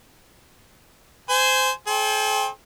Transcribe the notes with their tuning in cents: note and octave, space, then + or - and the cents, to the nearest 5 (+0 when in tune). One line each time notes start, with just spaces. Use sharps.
C5 -15 G#5 +0
A4 -45 C5 +25 G5 +25